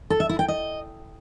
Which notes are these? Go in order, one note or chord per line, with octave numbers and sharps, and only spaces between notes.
A4
E5
E4
G5
D#5